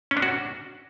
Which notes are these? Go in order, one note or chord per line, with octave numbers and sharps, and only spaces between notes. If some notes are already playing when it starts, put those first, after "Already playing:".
C#4
D4
F#4